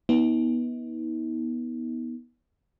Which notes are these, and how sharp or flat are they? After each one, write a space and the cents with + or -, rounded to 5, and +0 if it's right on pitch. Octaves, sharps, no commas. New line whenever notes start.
B3 -20 D#4 +40